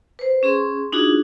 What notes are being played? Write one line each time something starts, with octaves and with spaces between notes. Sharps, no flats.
B4 C5
C#4 G#4 C6
D4 D#4 F4 F#4 G#4